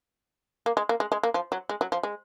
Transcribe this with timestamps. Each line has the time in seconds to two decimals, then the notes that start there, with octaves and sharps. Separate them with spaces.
0.66 A#3
0.77 G#3
0.89 A#3
1.00 G#3
1.12 G#3
1.23 A#3
1.34 F3
1.52 F#3
1.69 G#3
1.81 F#3
1.92 F3
2.03 G#3